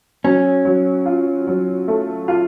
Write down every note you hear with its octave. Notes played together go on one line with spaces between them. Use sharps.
F#3 C#4
F#3
F4
F#3
A3
F4